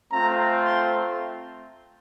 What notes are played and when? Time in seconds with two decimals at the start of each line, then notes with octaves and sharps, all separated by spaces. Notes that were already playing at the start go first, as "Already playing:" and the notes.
0.11 A3 C4 F4 A#5
0.64 C6